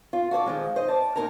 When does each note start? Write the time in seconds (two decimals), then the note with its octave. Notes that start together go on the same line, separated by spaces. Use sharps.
0.13 F4
0.31 F#4 A4 C#5 D5
0.46 D#3 F3 G#3
0.76 C5 D#5
0.88 D5 A5
1.16 A#2 D#4 A#4 G#5 A#5